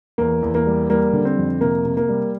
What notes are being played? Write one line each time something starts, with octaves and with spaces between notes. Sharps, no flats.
E2 A#3
E2
A#3
G3
G3 A#3
D3
C4
F2
C3 A#3
C3
A#3
G3